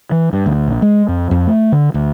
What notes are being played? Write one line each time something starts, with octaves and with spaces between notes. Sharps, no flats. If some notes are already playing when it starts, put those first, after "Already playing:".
E3
G2
D2
A#1
G#3
F2
F2
A3
D3
D2